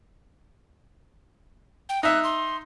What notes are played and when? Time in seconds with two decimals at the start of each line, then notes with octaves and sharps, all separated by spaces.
1.89 G5
2.03 D#4 E5 F#6
2.24 C6